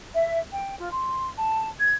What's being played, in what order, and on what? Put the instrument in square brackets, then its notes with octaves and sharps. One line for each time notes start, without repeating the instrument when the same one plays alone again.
[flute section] E5
G5
F4
C6
A5
G#6